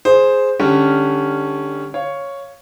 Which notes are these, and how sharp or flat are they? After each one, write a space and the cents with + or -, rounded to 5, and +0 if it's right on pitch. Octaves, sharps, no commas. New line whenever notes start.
G#4 +5 C5 +0
D3 +15 G3 +20 C#4 +0
C#5 +0 F5 +0